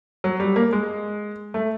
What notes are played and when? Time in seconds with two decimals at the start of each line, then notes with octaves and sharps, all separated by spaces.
0.24 F#3
0.40 G3
0.56 A#3
0.73 G#3
1.54 A3